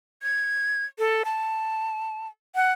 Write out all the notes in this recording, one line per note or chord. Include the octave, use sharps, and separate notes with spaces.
G#6
A4
A5
F#5